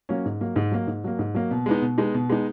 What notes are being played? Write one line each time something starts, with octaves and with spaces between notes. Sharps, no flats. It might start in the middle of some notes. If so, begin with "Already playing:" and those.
F#3 A#3 C#4
G#2
F#3 A#3
G#2
F#3 A#3
G#2
F#3 A#3
G#2
F#3 A#3
B2
G#3 B3 D#4
B2
G#3 B3 D#4
B2
G#3 B3 D#4